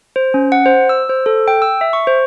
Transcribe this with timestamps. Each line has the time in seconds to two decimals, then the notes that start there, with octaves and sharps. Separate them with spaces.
0.16 C5
0.34 C#4
0.52 F#5
0.66 C5
0.89 E6
1.09 C5
1.26 A4
1.48 G5
1.62 E6
1.81 E5
1.93 C#6
2.07 C5